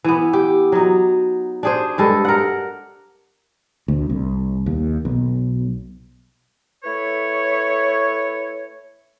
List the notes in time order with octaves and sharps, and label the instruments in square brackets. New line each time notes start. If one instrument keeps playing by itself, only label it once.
[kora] E3 B3
G4
F#3 D#4
D4 G#4 C5
G2 G#3 A4
A#4 F#5
[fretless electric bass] D2
C2
D#2
B1
[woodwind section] A3 E4 B4 C#5